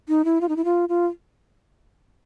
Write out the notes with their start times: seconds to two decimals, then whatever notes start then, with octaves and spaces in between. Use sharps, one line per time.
0.09 D#4
0.25 E4
0.41 F4
0.49 D#4
0.56 E4
0.65 F4
0.89 F4